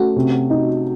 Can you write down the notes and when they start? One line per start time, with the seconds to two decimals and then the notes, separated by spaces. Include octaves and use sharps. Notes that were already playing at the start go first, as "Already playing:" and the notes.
Already playing: A3 C#4 F#4
0.16 C3
0.50 D#4